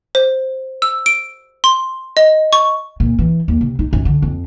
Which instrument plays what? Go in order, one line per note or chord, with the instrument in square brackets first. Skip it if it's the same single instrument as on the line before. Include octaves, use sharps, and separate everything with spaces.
[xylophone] C5
E6
D7
C6
D#5
C#6
[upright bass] A#2
E3
D#2
C3
D#4
F#2
D3
F2